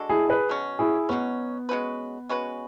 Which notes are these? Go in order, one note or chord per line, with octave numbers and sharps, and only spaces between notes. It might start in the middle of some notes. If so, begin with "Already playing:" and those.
Already playing: G#3 D4 F#4 A4
E4 G#4
G#4 B4
B2 F#3 C#4
E4 G#4
B2 F#3 B3 C#4
G#3 C#4 F#4 B4
G#3 C#4 F#4 B4